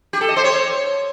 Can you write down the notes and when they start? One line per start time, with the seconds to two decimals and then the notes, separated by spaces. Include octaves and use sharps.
0.13 G4
0.21 A4
0.29 D#5
0.36 C5
0.44 C#5